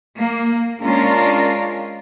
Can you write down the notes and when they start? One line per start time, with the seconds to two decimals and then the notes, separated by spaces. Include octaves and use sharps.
0.19 A#3
0.81 G#3 C#4 D4 F4 A#4